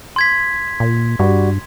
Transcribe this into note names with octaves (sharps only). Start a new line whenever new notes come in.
C6 G#6 B6
A#2
G2 G3 F#4